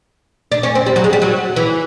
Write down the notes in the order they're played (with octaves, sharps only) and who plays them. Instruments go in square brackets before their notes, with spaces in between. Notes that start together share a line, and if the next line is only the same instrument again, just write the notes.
[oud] D4
C#4
C4
G3
F#3
G#3
G3
F#3
E3